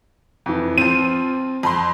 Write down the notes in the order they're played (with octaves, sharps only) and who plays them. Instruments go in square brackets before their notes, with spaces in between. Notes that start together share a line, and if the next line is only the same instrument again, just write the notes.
[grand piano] F2 E3
[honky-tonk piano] F3 D#7 [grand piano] C4
[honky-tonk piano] F2 B5 C6